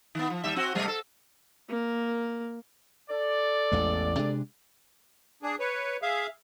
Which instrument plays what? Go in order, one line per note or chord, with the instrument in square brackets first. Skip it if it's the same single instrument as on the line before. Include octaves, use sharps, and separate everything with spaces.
[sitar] D#3 B3
F3
D#2 G3 E5
C4 F#4
C3 G3 A3
A4
[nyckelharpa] A#3 A#4
[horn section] A4 D5
[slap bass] A1 E2 G#3
C3 G#3 D4
[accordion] D4 G#4
B4 C#5
G#4 E5 F5